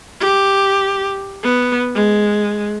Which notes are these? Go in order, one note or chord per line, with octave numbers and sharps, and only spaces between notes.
G4
B3
G#3